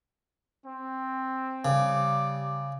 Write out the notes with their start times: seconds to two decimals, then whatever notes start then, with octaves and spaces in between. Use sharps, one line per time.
0.64 C4
1.65 C#3 G3 D6